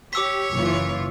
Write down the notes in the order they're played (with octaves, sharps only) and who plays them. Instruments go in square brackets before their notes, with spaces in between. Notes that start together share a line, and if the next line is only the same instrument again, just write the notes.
[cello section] G4 [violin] C#5 [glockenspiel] D6 E6 B6
[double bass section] F#1 [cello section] E3 F4